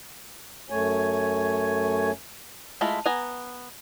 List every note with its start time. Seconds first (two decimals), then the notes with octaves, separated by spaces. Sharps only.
0.70 F#2 A3 C#5 G#5
2.81 G#3 A3 E4 F4 A4
3.06 B3 G#5 A#5